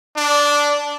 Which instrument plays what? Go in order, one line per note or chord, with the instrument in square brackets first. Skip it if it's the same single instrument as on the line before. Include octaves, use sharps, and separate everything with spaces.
[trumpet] D4